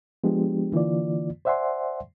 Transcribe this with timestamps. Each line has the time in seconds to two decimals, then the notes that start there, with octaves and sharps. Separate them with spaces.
0.24 F3 G#3 B3 D4 G4
0.72 D3 E3 A#3 F4 D5
1.45 C5 D5 E5 F#5 G#5 C6